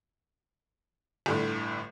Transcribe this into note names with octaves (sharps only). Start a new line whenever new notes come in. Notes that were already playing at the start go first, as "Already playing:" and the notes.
G1 A2 D3